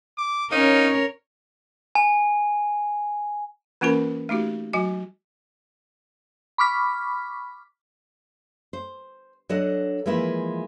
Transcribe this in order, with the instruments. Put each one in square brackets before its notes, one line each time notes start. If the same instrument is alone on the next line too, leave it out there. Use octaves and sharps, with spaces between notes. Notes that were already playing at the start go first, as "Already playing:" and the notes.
[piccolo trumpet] D6
[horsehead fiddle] C#4 [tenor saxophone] D#4 [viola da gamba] A#4 C#5 [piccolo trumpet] F5
[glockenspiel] G#5
[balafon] E3 A#3 C#4 F4 A#4 B5
A3 D#4 F#4 G4
F#3 F#4 G#5
[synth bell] B5 C#6 D6 F6 B6
[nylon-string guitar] C5
F#3 D4 A4 D#5 F#5
E3 F3 G#3 A#3 E4 F4